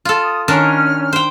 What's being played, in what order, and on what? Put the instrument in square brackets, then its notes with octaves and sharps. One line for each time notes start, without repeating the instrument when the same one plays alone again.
[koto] F4 A4
[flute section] D#6
[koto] D#3 D4 A#4 [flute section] C#4 F6
[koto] C5 G5